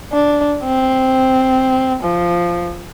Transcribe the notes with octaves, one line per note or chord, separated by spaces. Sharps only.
D4
C4
F3